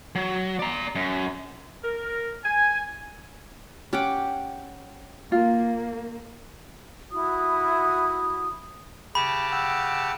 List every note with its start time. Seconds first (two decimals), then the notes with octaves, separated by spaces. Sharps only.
0.15 F#3
0.59 D5 A#5
0.95 F#2
1.83 A#4
2.43 G#5
3.93 C#4 G4 F#5 D6
5.32 A#3 F4
7.11 E4 F#4 D#6
9.15 C#3 G4 G5 A5 B5
9.52 F#5 G5 E6